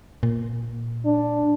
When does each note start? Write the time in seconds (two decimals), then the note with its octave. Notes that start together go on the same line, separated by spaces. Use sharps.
0.23 A#2
1.05 D4